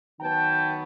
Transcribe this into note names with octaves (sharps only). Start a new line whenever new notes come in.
D#3 F#3 B3 G5 A5